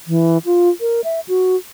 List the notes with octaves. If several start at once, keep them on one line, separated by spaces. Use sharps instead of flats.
E3
F4
A#4
E5
F#4